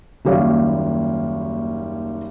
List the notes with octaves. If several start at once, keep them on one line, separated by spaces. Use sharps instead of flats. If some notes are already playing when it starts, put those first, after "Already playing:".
F#1 D#2 G3 C#5 F5